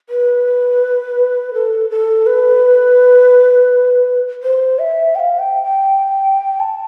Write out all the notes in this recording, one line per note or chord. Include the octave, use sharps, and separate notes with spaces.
B4
A4
A4
B4
C5
E5
G5
F5
G5
G5
A5